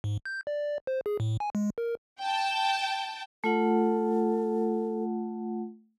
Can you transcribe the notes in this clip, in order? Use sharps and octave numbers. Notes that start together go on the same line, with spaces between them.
G#2
G6
D5
C5
G#4
A2
G#5
G#3
A#4
G5 A5
A3 F4 A4 F#5